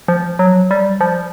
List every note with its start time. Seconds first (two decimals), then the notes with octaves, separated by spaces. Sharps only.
0.08 F3
0.39 F#3
0.71 G3
1.01 F3